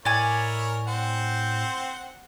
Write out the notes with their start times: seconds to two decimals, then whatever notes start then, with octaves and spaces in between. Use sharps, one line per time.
0.05 A2 E4 A#4 C#5 D5 G#5
0.87 C4 C5 F#5